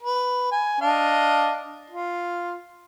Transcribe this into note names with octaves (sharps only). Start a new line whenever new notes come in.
B4
G#5
D4 D#5 F5
F4